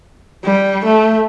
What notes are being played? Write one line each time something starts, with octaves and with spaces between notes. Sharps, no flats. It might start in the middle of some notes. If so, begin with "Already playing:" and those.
G3
A3